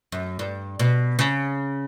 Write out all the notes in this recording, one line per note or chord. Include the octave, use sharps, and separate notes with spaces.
F#2
G2
B2
C#3